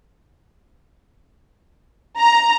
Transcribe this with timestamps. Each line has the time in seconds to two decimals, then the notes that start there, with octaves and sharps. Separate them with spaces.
2.19 A#5